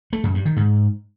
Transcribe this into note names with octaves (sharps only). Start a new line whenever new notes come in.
A3
F#2
G2
D#3
G#2